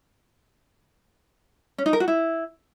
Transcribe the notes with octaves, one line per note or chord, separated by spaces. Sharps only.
C#4
D#4
A#4
F#4
E4